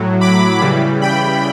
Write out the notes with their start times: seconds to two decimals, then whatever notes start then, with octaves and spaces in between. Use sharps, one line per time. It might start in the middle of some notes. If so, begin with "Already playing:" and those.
Already playing: A2 F#3
0.21 B5 D6
0.61 C#3 E3 G3
1.01 G5 B5